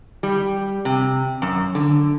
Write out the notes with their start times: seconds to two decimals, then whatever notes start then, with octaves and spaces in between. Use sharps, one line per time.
0.23 G3
0.85 C3
1.42 F#2
1.75 D3